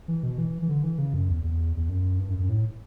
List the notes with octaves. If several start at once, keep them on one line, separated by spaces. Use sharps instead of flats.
E3
B2
E3
E3
D3
E3
C#3
F#2
E2
E2
E2
F#2
G2
F#2
F#2
A2